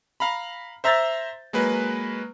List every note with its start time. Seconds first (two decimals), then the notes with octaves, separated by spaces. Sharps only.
0.20 F5 A#5 B5
0.84 C5 E5 A#5 E6 G6 A6
1.53 F#3 G#3 A#3 B4